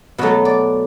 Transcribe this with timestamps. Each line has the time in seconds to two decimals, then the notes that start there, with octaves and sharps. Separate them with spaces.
0.18 B2 F#3 A3 F#5
0.45 D5